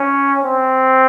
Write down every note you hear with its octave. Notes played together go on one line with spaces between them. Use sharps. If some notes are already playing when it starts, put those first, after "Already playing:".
Already playing: C#4
C4